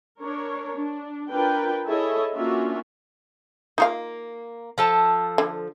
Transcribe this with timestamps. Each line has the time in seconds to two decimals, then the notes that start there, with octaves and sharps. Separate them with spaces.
0.21 D4 A#4 C#5
0.77 D4
1.31 D4 F4 A#4 B4 G5
1.86 E4 G#4 A4 C#5 D#5 E5
2.34 A#3 C#4 D4 F4 F#4 E5
3.78 A#3 D#4 F4 F5
4.78 F3 A4 A5
5.38 D3